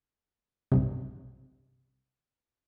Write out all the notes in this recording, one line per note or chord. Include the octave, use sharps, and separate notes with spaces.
B1 G2 C3